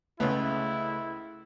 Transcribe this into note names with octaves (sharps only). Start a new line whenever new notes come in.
C#2 C#3 A3 B3 E4